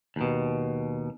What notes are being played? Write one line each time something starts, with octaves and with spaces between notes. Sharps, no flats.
D#2 B2